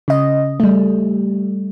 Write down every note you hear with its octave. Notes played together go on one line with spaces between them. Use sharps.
C#3 D#5
G3 A3